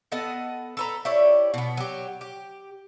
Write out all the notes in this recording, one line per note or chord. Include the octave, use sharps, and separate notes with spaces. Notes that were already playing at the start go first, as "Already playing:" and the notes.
B3 A4 D#5 F#5
A4 B4 A#5
E4 G4 C#5 D5
B2 B3
F#3 G4
G4